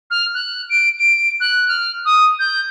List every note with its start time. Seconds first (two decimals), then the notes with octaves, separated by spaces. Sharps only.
0.10 F6
0.34 F#6
0.69 D7
0.99 D7
1.40 F#6
1.68 F6
2.05 D#6
2.39 G6